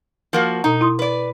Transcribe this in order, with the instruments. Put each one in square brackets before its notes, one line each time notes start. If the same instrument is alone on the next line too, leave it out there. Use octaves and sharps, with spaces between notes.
[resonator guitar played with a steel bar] F3 A#3 F#4
[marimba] B2 A#5 [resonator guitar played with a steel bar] D#4
[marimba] E4 C6 D#6
[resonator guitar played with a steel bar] B4 D5